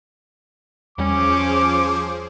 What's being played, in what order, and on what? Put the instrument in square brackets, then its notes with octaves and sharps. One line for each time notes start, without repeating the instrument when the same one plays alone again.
[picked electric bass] E2 G3 [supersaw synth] F3 G#4 C5 [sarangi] C#4 [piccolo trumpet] D6